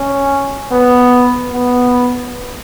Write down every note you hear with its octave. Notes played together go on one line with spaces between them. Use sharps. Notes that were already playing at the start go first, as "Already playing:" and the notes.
Already playing: C#4
B3
B3